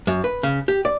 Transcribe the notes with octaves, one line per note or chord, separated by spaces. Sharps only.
F#2
B4
C#3
G4
D5